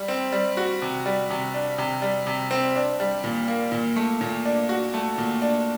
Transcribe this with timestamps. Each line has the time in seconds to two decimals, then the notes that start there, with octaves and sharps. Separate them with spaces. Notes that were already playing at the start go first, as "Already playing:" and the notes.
Already playing: G3
0.08 C4
0.32 G3
0.57 F#4
0.82 C3
1.06 G3
1.30 C3
1.54 D4
1.78 C3
2.02 G3
2.27 C3
2.51 C4
2.75 D4
3.00 G3
3.24 A#2
3.48 A#3
3.72 A#2
3.96 A3
4.21 A#2
4.45 D4
4.69 F#4
4.94 A3
5.18 A#2
5.42 D4